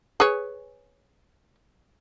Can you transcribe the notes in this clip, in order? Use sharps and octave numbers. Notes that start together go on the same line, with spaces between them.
G#4 B4 C#5